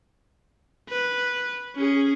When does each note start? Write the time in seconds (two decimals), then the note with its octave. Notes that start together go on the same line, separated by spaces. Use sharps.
0.89 B4
1.75 C#4 G#4